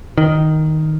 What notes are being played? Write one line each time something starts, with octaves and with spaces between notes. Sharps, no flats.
D#3